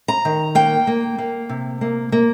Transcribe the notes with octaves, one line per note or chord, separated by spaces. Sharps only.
A#5
D#3
A#3 G5
A#3
A#3
C3
A#3
A#3